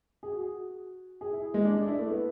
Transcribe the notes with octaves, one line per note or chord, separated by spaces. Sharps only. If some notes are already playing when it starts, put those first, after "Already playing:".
G#4
F#4
G#4
E4
G#3
D4
D4
E4
A3
B3